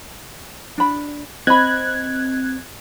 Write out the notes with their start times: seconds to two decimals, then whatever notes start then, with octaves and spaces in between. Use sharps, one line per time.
0.78 D4 B5
1.47 C4 D#5 B5 F#6 G#6